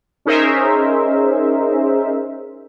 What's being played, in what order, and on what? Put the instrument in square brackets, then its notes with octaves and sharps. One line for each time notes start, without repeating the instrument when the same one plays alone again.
[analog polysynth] C#4 D#4 G#4 A#4 C5 E5